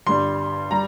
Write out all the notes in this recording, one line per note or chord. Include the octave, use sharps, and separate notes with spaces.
G1 G2 G3 C6
G3 A#5